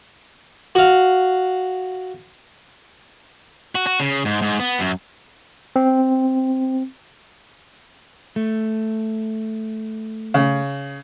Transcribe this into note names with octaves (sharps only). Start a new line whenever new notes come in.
F#4 F5
F#4
F#4
C#3
G#2
G#2
B3
F#2
C4
A3
C#3